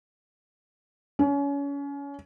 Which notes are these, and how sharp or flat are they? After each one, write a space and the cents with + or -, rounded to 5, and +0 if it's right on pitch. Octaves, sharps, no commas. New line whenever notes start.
C#4 +30